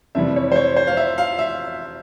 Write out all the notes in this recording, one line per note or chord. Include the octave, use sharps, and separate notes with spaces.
F2 C3 E3 G3 E5
C#5
C5
C#5
C5
F5
E5
F5
E5